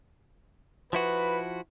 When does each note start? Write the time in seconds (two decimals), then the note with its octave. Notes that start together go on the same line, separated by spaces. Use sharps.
0.93 F3 E4 F#4 B4